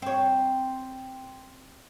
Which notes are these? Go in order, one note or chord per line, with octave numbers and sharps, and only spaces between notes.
C4 C#5